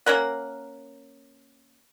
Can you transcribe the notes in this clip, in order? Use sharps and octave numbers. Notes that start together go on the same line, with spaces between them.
A#3 C#4 A#4 F#5